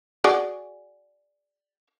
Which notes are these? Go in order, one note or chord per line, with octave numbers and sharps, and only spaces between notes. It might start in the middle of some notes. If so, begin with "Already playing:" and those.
F#4 G#4 D5